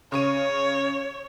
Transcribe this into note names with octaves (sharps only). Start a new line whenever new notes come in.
C#3 C#5 C#6 D#7